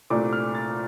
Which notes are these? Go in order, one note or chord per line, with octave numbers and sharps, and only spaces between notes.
C2 A#2 A3 D4 D6
F6
A6